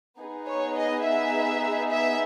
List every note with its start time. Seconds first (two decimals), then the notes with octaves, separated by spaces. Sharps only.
0.19 B3 D#4 G#4
0.48 C#5
0.76 D#5
1.05 E5
1.90 E5